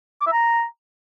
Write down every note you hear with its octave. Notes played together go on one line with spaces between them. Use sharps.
D6
E5
A#5